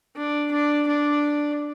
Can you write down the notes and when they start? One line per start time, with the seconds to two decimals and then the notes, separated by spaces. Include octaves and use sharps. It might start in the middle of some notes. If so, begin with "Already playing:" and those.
0.16 D4
0.51 D4
0.87 D4